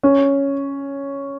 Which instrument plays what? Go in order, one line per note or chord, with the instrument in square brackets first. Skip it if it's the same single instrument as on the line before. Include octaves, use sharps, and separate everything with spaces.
[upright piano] C#4